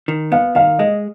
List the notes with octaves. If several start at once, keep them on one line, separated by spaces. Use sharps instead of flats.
D#3
B3 F5
D#3 F5
G#3 D#5